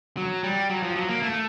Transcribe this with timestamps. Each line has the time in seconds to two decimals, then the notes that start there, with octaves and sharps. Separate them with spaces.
0.17 F#3
0.43 G3
0.70 F#3
0.83 F3
0.96 F#3
1.09 A#3
1.23 A3